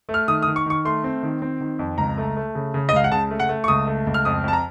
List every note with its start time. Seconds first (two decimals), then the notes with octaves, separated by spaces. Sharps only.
0.09 A3
0.14 F6
0.28 D#3 D#6
0.42 D#6
0.48 D#3
0.56 C#6
0.66 D#3 C#6
0.85 A3 C6
1.04 C4
1.23 D#3
1.42 C4
1.61 D#3
1.79 F2
1.98 C#2 A#5
2.18 A3
2.37 A3
2.55 C#3
2.74 C#3
2.89 D#5
2.93 C#2 F5
3.04 F#5
3.11 C#3 A5
3.31 A3
3.40 F#5
3.49 A3
3.64 C#6
3.68 C#2 D#6
3.87 A3
4.06 C#2
4.14 F6
4.25 F2 D#6
4.44 F2 A5
4.53 A#5